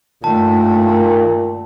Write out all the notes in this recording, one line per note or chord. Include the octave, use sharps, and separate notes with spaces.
G2 A#2 D#3 A3 A5